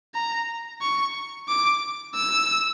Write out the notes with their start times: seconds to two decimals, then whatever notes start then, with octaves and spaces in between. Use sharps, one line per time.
0.14 A#5
0.81 C#6
1.48 D6
2.14 E6